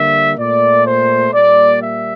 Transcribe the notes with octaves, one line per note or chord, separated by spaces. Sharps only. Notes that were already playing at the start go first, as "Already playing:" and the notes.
Already playing: D3 G3 A#3 E5
A#2 A3 D5
C5
A#2 G3 A#3 D5
E5